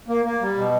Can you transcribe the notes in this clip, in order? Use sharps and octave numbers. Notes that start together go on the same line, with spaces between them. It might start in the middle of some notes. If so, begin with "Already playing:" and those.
A#3
A#3
G3
B2